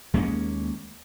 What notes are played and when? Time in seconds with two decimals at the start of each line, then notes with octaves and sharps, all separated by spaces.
0.14 D#2 G#3 A#3 C#4